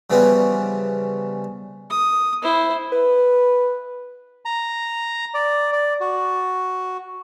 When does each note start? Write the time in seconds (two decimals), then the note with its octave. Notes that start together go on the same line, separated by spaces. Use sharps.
0.10 C#3 E3 F3 G3 B3 C#4
1.90 D#6
2.42 E4 C5
2.92 B4
4.45 A#5
5.34 D5
5.72 D5
6.01 F#4